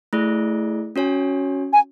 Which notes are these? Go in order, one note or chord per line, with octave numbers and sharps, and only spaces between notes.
A3 E4 G#4 D5
C#4 F#4 C#5 G#5
G#5